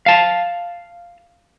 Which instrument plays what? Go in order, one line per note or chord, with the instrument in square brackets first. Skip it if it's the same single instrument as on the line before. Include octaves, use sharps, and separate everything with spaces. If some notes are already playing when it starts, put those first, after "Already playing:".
[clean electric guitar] F5 A5